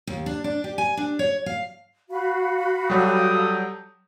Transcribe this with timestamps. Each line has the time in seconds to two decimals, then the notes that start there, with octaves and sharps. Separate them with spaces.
0.07 D#2
0.26 D4
0.44 D4
0.64 G4
0.78 G#5
0.97 D4
1.19 C#5
1.46 F5
2.10 F#4 F5 B5
2.90 F#3 G3 A4 G5 D#6